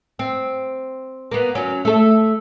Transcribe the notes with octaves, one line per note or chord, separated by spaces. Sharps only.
C4
A#3 B3
F#3 C#4
A3 A4